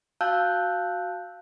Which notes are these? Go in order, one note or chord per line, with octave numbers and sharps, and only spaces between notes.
F#4 F5 A5 E6 F#6 G6